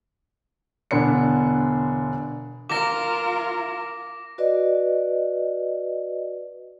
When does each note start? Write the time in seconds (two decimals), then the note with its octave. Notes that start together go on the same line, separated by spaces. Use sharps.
0.91 E1 D3 B3 D4 C#7
2.70 F4 A#4 D6 A#6
4.38 F#4 B4 D5 D#5